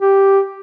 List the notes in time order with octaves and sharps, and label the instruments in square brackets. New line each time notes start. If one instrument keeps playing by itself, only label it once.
[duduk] G4